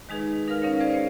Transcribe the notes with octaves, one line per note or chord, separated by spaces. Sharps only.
D#3 G#3 D#4 G#4 B4
D#4 A#4 B4 F5 F6
C#4 D#4 A#4 C#5 F5
G#4 C5 D5 F5
C#4 C5 C#5